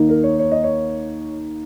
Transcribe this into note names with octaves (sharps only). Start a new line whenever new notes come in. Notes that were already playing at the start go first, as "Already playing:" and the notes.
Already playing: D#2 D#3 A#3 D#4
A#4
C#5
C#5
D#5
C#5